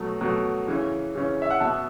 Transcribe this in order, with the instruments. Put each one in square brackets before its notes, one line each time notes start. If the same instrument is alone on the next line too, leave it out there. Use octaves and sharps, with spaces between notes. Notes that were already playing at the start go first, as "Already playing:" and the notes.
Already playing: [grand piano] B2 F#3 A3
B2 F#3 A3
C#3 E3 C#4
C#3 E3 C#4
E5
F#5
B2 B3 E5 A5